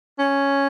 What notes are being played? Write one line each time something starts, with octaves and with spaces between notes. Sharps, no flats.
C#4